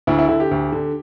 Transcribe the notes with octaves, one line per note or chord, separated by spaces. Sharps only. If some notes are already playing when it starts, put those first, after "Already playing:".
D2 E4
E4
D3 E4
G4
D2
D3